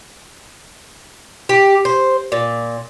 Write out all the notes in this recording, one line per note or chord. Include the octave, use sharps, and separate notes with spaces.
G4
C5
A#2